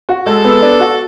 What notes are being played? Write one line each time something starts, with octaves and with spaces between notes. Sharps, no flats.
F#4
G#3 A4
B3
D4
F#4